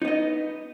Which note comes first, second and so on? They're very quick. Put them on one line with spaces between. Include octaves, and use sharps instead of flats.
D#4 B3 D#5